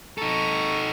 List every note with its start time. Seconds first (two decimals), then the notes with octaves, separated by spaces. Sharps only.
0.18 D#4 A4 A#5 C#6